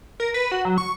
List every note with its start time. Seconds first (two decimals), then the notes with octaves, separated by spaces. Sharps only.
0.20 A#4
0.34 B4
0.52 F#4
0.65 F#3
0.78 C#6